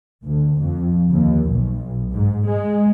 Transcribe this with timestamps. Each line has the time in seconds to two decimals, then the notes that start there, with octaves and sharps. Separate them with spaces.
0.24 D2
0.60 F2
1.11 D#2
1.51 B1
2.14 G#2
2.48 G#3